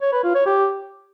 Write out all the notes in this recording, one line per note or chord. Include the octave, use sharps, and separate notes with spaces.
C#5
B4
F4
C#5
G4